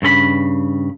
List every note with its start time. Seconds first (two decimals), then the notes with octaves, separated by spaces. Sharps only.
0.02 G2 C#3 A4 B5